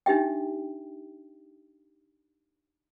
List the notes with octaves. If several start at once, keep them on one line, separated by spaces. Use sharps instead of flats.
D4 D#4 G4 E5 G5